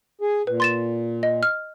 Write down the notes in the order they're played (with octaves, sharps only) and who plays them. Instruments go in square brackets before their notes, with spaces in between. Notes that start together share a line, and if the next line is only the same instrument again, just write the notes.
[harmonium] G#4
[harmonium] A#2 [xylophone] B4
[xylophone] C6 A6 E7
D#5
F6